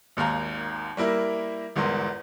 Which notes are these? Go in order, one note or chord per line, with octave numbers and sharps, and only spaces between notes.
G#1 D#2 F5 A#5
G3 A#3 E4 A#4
G1 E2 G#2 A#4 C6